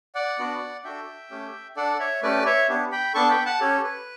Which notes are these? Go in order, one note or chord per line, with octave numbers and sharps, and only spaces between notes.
D5 F#5
B3 D4 F#4
D4 F#4 A4 E5 G5
A3 C#4 G4
D4 A4 D5 F#5
C#5 E5
A3 C#4 G4 B4 D5
C#5 E5
B3 D4 G4
G5 B5
B3 D4 A4 A5 C#6
G5 B5
F#5 A5
C#4 G4 A4 C#5
B4